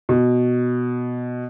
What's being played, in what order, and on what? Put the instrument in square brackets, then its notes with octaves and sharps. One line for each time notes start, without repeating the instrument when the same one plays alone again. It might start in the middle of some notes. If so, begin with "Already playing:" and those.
[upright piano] B2